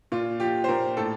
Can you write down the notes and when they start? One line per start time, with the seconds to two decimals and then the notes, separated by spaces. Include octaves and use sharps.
0.12 A#2 F4
0.40 F3 G4
0.64 C5
0.68 A#2 A#4
0.97 A2 A4